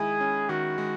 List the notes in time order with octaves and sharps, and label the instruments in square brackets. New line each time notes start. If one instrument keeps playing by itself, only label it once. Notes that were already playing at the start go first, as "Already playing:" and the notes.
Already playing: [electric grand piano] D#3 G#3 E4 [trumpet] G#4
[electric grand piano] C#4
[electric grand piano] D#3 [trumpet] F#4
[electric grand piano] G#3